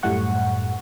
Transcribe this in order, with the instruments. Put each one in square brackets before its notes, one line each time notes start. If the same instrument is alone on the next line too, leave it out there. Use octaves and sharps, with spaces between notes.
[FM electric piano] F#2 A2 G3 A3 F#5 C#6